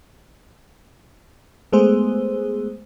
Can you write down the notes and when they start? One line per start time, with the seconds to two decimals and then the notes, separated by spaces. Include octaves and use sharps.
1.73 G#3 A3 B3 G#4 C5